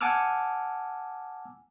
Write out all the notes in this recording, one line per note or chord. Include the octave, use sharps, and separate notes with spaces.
F#5 G#5 A5 D6 E6 F6